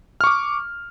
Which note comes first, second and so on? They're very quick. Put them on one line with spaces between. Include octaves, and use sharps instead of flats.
F6 C#6 D6